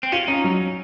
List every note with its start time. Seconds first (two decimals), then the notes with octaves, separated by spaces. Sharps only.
0.03 C4
0.12 C#4 F4
0.28 C#4 D#4
0.44 F#3